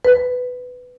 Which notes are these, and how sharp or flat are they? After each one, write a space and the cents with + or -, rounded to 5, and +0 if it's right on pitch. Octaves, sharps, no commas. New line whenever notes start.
B4 +10